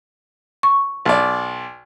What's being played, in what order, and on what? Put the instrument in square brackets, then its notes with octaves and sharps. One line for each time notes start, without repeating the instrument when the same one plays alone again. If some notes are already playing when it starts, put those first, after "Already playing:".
[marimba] C#6
[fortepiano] B1 D5